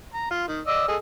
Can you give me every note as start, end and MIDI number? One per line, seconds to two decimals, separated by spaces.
0.14 0.30 82
0.31 0.44 65
0.48 0.61 51
0.67 0.83 74
0.67 0.83 75
0.67 0.83 88
0.88 0.96 68
0.88 0.96 69
0.88 0.96 75